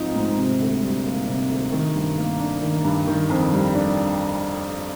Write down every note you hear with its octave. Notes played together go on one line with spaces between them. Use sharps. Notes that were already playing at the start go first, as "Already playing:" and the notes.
Already playing: G#2 F3 C4 D#4
G#2
C3
D2
G3
A#3
C3
D2
D#3
G2
A#3
D4
D#3
G2
D#3
F2
G3
D4